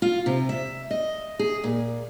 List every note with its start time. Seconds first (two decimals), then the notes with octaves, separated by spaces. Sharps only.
0.02 F4
0.26 C3
0.49 E5
0.91 D#5
1.39 G#4
1.64 A#2